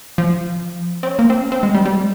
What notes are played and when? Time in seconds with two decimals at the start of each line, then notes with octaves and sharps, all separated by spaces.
0.18 F3
1.03 C4
1.07 C#4
1.19 A#3
1.30 C4
1.40 C#4
1.52 C4
1.63 G#3
1.74 G3
1.85 G3
1.93 G#3